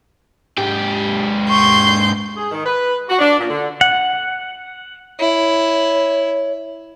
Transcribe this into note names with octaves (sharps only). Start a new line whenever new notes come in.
G#2 G4
C6 C#6 G6
G#4
D#3
B4
F#4
D4
A#2
D3
F#5
E4 C#5